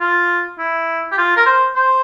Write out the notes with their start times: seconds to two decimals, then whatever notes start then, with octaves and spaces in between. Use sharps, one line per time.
0.01 F4
0.59 E4
1.12 G4
1.18 F4
1.37 A#4
1.46 C5
1.75 C5